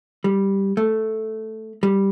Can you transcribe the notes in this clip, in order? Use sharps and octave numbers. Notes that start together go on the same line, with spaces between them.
G3
A3
G3